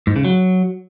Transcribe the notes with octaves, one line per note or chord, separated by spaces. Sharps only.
G#2
C#3
F#3